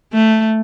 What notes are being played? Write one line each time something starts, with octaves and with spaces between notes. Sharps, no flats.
A3